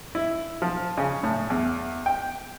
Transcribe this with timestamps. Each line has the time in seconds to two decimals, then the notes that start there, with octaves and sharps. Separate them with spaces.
0.15 E4
0.62 F3
0.97 C#3
1.23 A2
1.50 E2
2.06 G5